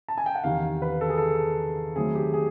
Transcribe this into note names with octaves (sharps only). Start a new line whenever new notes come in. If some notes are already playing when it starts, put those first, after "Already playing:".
A5
G#5
G5
F#5
E2 C3 D#3 F5
B4
A4
G#4
A4
D#3 F#3 A3 C4 G#4
G4
G#4